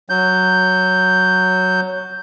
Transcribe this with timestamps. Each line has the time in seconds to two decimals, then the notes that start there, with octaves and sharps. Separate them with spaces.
0.09 F#3 G6